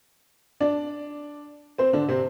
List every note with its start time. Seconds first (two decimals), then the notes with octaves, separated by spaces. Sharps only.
0.60 D4 D5
1.78 C4 C5
1.93 D3 D4
2.08 C3 C4